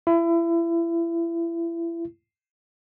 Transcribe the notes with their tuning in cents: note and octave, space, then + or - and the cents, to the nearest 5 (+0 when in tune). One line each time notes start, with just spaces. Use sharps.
E4 +30